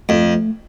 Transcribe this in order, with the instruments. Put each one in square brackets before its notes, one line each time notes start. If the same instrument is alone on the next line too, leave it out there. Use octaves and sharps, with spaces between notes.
[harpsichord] F2 [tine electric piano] A3